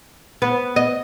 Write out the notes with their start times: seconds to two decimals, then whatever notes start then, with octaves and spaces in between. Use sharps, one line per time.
0.42 B3
0.76 D#5